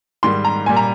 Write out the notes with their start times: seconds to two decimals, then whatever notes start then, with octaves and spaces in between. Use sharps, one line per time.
0.23 G#2 D#3 G3 C6
0.45 A#5
0.66 A#2 G3 G#5
0.76 A#5